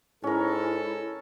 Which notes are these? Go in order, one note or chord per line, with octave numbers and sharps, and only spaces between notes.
G#2 C#4 E4 A4 A#4